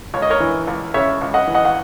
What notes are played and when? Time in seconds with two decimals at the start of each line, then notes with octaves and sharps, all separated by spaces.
0.14 C#2 C#5
0.22 D#5
0.30 A#4 C#5
0.40 E3
0.67 C#2
0.94 C#3 C#5 E5
1.21 C#2
1.34 D#5 F#5
1.48 E3
1.54 D#5 F#5
1.65 F#5